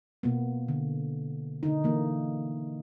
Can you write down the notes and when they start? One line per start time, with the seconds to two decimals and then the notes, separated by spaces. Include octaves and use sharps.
0.23 B2 A#3 B3
0.68 D3
1.63 D3 D#4
1.84 E3 A#3